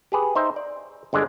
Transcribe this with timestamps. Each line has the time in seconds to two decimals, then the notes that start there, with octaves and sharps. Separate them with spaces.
0.12 G4 G#4 B4
0.35 D#4 C5 E5
0.56 D5
1.13 G1 D3 G#3 D5